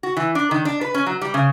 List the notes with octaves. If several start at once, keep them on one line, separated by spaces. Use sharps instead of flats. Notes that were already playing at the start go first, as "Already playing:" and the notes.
F#4
E3
D4
D#3
D4
B4
C#4
F#3
G3
C#3